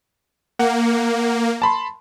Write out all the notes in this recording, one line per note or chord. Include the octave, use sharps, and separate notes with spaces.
A#3 F#5
A5 B5 C6